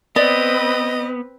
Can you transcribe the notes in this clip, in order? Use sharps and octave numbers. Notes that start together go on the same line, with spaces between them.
B3 C4 B4 D5 D#5